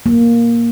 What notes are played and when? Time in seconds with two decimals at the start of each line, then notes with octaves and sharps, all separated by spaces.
0.06 A#3